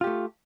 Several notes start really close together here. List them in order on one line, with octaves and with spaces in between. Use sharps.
F4 G4 A3